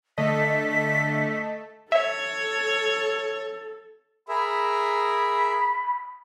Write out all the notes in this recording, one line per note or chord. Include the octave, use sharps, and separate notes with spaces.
D3 A3 A4 D#5 B6
A4 C#5 E5
G#4 A#4 E5 B5